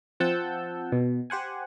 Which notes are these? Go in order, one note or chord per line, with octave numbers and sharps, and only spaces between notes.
F3 C4 F#5 A5 E6 G6
B2
G4 C5 F#5 G#5